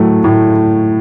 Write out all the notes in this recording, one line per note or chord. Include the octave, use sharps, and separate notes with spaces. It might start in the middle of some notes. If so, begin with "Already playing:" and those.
Already playing: A2 F#3 A3
A2